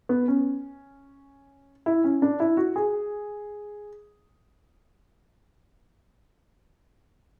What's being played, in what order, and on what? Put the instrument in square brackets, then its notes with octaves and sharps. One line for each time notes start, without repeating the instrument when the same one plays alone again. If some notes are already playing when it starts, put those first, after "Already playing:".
[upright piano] B3
C#4
E4
C#4
D4
E4
F#4
G#4